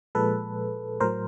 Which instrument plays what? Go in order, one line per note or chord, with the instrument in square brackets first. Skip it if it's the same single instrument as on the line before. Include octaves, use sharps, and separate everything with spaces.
[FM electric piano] A#2 F3 G#3 A4 B4
A2 F#3 A#4 C5